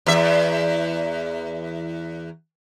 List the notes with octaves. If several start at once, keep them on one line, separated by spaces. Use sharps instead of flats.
E2 E5